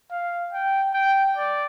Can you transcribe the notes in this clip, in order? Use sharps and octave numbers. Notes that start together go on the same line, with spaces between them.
F5
G5
G5
D5